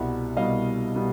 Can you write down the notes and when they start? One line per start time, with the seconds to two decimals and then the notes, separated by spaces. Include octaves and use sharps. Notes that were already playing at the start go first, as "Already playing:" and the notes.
Already playing: C2 B2 G3 E5 F#5
0.37 C2 B2 G3 D#5 F5
0.96 B2 G3